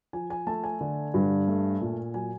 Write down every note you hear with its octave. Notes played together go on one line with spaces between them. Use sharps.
F3 G#5
G#5
A3 A5
G#5
D3
G2
A3
A#2
F#3 G#5